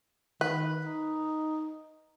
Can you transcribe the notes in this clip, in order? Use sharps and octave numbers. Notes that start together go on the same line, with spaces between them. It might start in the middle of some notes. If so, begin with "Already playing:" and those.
D#3 B4
D#4